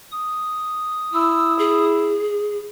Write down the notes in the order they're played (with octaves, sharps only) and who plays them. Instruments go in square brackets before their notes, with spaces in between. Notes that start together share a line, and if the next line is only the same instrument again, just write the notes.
[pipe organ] D#6
[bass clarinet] E4 [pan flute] E6
[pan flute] G#4